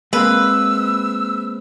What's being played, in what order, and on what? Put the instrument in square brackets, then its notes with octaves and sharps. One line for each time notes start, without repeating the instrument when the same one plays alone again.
[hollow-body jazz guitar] G#3 A#3 C4 [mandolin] B4 [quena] E6